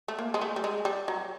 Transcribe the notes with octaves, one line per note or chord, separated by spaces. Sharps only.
A3
A#3
G#3
A3
G3
G#3
G3
F#3